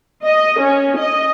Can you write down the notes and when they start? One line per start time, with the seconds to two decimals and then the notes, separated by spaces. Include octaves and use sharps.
0.24 D#5
0.59 C#4
0.98 D#5